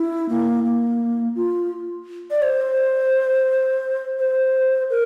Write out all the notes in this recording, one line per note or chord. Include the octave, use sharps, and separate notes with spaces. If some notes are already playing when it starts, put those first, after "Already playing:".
Already playing: E4
A#3
A#3
F4
D5
C5
C5
A#4